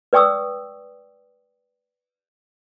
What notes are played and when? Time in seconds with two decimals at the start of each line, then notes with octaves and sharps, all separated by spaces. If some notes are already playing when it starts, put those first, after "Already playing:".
0.13 B4 D5 G5 C#6 D#6 E6